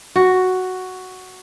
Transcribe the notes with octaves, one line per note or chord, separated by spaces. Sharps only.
F#4